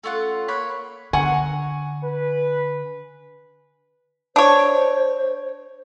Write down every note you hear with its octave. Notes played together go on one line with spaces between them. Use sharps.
A3 C#4 F4 F#5
A#3 C#5 B5 F#6
D3 F#5 G#5 A#5 C#6
B4
D4 C5 C#5